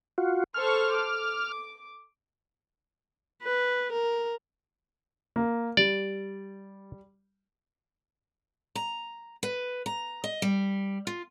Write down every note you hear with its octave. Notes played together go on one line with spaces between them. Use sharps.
F4 F#4
A4 C5 C#6 F6
D6
B4
A#4
A#3
G3 D5
A#5
B4
A#5
D#5
G3
F4